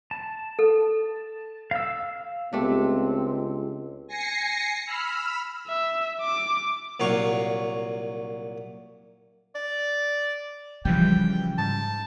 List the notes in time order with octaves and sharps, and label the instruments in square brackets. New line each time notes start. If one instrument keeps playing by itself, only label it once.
[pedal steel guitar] A5
[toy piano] A4
[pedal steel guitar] F5 E6
[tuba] C#2 [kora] A3 D4 [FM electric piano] B3 G4 [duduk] C4
[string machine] G#5 A#6 C7 C#7
B5 E6 F6
[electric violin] E5
D6
[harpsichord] C2 A#2 F#3 F5 C#6
[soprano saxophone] D5
[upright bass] C#3 [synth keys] E3 F3 G3 [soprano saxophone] G5
[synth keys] G#2 [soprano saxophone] A5